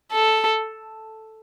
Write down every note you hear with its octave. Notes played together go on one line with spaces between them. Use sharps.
A4